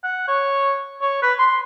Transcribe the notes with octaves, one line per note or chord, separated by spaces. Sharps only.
F#5
C#5
C#5
B4
C6